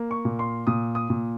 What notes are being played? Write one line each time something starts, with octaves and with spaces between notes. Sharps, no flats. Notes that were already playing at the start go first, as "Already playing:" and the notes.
Already playing: A#3
C#6
A#2
C6
A#2 D#6
D#6
A#2